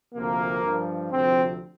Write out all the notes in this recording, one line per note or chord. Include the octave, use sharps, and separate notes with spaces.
D2 C3 F3 A#3
G2 F3
D2 C3 F3 C4